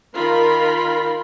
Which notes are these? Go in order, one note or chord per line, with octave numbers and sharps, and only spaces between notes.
D#3 F4 A#4 B5